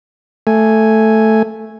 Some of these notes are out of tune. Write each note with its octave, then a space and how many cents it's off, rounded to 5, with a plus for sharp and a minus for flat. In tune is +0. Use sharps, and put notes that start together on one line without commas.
A3 +0 G#5 +0